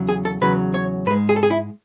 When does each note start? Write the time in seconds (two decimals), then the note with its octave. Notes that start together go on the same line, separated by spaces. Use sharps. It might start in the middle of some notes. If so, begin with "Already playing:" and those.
Already playing: E2 C#3 F#3
0.09 G#4
0.25 A4
0.41 E2 C#3 F#3 B4
0.74 C#5
1.06 G#2 B4
1.10 G#3
1.29 G#4
1.36 A4
1.43 G#4
1.50 E4